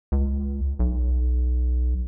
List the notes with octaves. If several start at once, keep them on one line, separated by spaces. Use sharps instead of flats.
C#2
B1